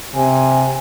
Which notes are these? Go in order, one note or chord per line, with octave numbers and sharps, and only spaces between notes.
C3 G#5